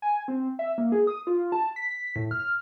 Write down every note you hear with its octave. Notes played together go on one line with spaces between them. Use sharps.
G#5
C4
E5
A#3
G#4
D#6
F4
A5
B6
A2
F6